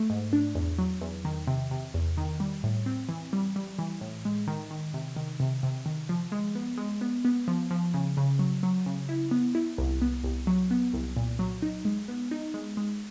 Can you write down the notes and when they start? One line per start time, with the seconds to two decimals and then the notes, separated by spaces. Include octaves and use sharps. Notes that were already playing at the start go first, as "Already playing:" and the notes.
Already playing: A3
0.10 G#2
0.33 D4
0.55 E2
0.78 F#3
1.01 E2
1.25 D#3
1.47 C3
1.71 C3
1.94 E2
2.18 D#3
2.40 G3
2.64 A2
2.86 C4
3.09 E3
3.33 G3
3.56 G3
3.79 E3
4.01 A2
4.25 G#3
4.48 D#3
4.71 D#3
4.94 C3
5.16 D#3
5.40 C3
5.63 C3
5.86 D#3
6.09 F3
6.32 G#3
6.55 B3
6.78 G#3
7.01 B3
7.25 B3
7.48 F3
7.71 F3
7.94 C#3
8.17 C#3
8.39 F#3
8.63 F#3
8.86 C#3
9.09 E4
9.31 B3
9.55 E4
9.78 C2
10.02 B3
10.24 C2
10.47 F#3
10.71 B3
10.93 C2
11.16 A#2
11.39 F#3
11.62 D#4
11.85 G#3
12.08 B3
12.31 D#4
12.54 G#3
12.77 G#3